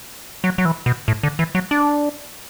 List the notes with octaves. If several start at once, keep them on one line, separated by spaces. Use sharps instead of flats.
F#3
F#3
E3
B2
A2
D3
E3
F#3
D4